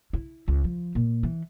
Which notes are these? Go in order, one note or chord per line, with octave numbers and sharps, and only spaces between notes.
E4
C#2
F3
A#2
E3